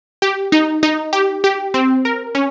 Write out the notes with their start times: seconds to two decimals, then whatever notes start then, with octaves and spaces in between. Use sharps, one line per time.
0.22 G4
0.52 D#4
0.83 D#4
1.13 G4
1.44 G4
1.74 C4
2.05 A#4
2.35 C#4